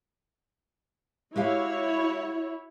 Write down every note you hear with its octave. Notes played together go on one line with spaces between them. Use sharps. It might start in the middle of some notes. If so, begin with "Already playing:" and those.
G#3 E4 F#4 G4 C#5 F5